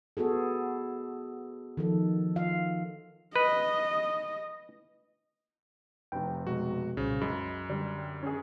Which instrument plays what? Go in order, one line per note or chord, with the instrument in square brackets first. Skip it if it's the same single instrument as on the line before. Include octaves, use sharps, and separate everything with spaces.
[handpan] B3 F#4 G#4 A4
D#3 F3 A4
F4 F5
[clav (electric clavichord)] B4 [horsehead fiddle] D#5
[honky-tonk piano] F1 C3 [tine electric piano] G5
[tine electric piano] B2 G#3 [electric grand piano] F#4
[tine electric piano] C2 A#2 C5 [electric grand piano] C#3
[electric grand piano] F#2 [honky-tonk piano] G#3 [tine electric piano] B5
[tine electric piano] D3 [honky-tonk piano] G3
[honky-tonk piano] C#4 G#4